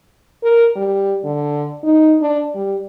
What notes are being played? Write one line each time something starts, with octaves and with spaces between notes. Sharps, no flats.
A#4
G3
D3
D#4
D4
G3